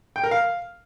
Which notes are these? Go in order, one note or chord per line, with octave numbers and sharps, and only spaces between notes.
G5
A#4
F5